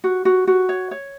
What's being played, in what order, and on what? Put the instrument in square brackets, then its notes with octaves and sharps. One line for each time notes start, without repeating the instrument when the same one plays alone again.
[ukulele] F#4
F#4
F#4
C#5
C#5